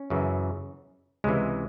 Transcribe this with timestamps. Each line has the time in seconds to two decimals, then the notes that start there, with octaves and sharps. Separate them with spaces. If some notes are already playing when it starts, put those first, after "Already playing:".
Already playing: C#4
0.10 F#2 C#3 E3
1.24 C#2 C3 E3 G#3